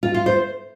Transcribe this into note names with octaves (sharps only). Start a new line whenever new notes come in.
F4
F4
C5